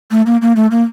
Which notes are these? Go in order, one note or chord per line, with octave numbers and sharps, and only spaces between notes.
A3
A#3
A#3
A3
A#3